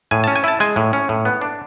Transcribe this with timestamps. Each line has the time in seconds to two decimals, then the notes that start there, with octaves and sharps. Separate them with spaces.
0.11 A2 G#5
0.24 A5
0.27 C#4
0.36 G#5
0.44 E4 A5
0.60 G#3 G#5
0.76 A2
0.93 C#4
1.09 A2
1.25 B3
1.41 D4